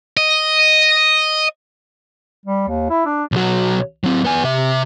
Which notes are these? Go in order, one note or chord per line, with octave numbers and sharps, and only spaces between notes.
D#5
G3
D#2
E4
D4
B1 F#3
F#3 C4
B3 G#5
C3 E5